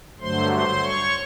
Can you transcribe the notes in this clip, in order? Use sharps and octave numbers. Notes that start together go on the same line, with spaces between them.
G2 D3 F#3 A3 C5 C6
C5 C6
C#5 C#6